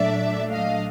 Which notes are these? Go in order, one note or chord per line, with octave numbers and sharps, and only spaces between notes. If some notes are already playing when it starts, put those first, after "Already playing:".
Already playing: A#2 F#3 A3 D4 D5 E5
D#5 F5